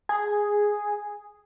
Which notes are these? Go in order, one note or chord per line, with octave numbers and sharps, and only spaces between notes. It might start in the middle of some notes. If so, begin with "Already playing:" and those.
G#4